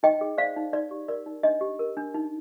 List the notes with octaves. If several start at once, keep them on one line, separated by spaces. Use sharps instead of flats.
D#4 D#5 G5
G#4
C5 D5 F5
D#4
D#4 D5
G4
A#4 D5
D#4
D4 D#5
G4
A#4
D4
D#4